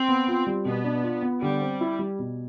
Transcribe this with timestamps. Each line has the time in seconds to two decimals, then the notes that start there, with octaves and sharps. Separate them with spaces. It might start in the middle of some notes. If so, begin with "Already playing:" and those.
Already playing: C4
0.09 B3
0.28 F4
0.47 G3
0.65 B2 B3
0.84 D4
1.03 F4
1.22 B3
1.42 D3 G3
1.61 C4
1.81 E4
1.99 G3
2.19 B2